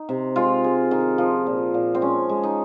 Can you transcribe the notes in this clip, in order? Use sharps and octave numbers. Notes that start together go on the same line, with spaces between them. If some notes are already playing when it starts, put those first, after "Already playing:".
Already playing: D#4
C3
G#3 F4
G#3
D#3
F3
A#2
A#2
C4
G#3 C#4
G#3
D#4